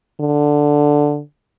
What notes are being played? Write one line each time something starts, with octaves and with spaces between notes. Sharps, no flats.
D3